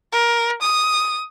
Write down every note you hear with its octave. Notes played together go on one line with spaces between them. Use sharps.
A#4
D#6